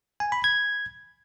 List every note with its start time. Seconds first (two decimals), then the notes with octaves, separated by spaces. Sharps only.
0.20 G#5
0.32 B5
0.44 G#6